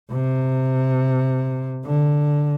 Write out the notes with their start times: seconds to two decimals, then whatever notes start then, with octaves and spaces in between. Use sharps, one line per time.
0.12 C3
1.85 D3